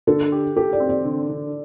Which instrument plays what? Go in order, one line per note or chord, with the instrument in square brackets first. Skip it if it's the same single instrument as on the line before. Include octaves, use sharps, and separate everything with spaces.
[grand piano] D3 [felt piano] A4
[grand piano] G4
[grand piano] G4 [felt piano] A4
[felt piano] D5
[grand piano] C4
[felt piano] D5
[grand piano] D3
D3